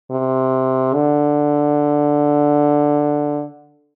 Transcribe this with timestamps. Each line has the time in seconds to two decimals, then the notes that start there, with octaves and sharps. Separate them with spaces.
0.11 C3
0.95 D3